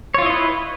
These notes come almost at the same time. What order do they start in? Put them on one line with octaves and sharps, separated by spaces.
C#5 F4 E4 D#5 B4